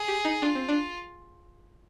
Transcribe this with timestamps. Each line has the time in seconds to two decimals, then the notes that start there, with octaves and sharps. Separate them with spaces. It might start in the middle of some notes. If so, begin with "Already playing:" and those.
Already playing: G#4
0.08 G4
0.25 D#4
0.42 D4 F4
0.55 C4
0.69 D4